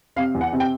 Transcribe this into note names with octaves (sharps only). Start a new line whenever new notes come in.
C3 F5
E2
F#5
C3
G5